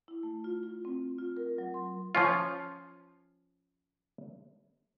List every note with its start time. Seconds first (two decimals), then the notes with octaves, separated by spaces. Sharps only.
0.08 E4
0.23 A3
0.44 F4
0.63 F4
0.85 C4
1.18 F4
1.37 A#4
1.58 F#3
1.74 C6
2.15 F3 C#4 F4